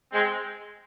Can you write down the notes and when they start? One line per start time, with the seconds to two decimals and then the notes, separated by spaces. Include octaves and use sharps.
0.12 G#3 C4